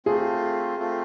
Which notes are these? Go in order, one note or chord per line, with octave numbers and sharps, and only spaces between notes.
A3 C4 F4 G#4
A3 C4 F4